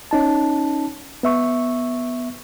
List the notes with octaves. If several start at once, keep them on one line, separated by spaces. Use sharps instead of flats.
C#4 D#4 A5
B3 E5 C#6